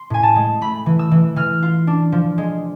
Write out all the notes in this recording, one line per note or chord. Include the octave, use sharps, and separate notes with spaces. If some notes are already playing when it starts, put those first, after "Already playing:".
Already playing: C6
A2 G#5
A5
G#3
A3 B5
E3
E6
E3
E3 F6
F4
D4
F3
G#3